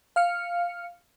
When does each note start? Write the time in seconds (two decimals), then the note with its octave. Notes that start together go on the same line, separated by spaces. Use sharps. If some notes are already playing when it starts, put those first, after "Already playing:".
0.16 F5 F6 C#7